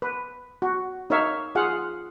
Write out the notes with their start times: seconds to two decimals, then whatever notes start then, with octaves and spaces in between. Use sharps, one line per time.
0.02 B4
0.62 F#4
1.10 D#4 A#4 C#5 E5 F5
1.55 F4 G#4 F5 F#5